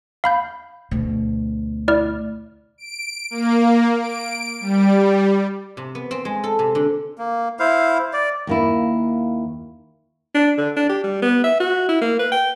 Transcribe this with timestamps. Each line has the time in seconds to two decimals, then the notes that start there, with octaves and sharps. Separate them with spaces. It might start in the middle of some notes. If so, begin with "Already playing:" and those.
0.24 F5 B5 G6
0.91 D2 B2
1.88 E4 D5 F6
2.78 D7
3.31 A#3
4.01 D7
4.61 G3
5.77 C3
5.95 B3
6.11 C4
6.25 G#3
6.44 A4
6.59 C3
6.75 D3
7.18 A#3
7.59 E4 C5 F5
8.13 D5
8.47 D#2 A#3 E4
10.34 D4
10.58 D3
10.76 D4
10.89 G4
11.04 G3
11.22 B3
11.44 E5
11.60 F#4
11.89 E4
12.01 A#3
12.19 B4
12.32 G5